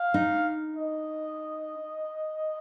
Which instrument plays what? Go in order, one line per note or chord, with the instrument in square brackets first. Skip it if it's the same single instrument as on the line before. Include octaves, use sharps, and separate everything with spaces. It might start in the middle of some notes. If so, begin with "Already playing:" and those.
Already playing: [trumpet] F5
[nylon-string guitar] D#4
[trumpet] D#5